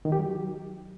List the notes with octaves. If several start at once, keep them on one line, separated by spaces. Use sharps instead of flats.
D#3
G4
F#3